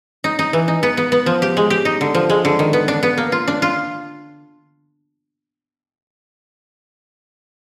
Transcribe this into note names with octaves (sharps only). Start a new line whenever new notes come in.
D#4
D#4
E3
D#4
B3
B3
B3
F3
G4
G#3
G4
D#4
D3
F3
G#3
D3
D#3
B3
D4
B3
A#3
F4
D4
F4